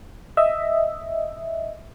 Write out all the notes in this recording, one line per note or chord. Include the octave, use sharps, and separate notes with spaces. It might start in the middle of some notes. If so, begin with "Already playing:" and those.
D#5 E5